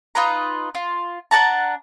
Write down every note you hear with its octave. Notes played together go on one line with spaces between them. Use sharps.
D#4 F4 B4 A#5
F4
D4 F#5 A5 A#5